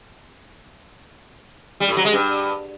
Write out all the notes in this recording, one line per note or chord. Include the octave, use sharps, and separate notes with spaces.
G3
A2
F#3
G#3
G2